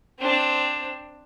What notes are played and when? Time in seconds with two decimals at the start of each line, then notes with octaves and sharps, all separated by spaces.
0.19 C4 D4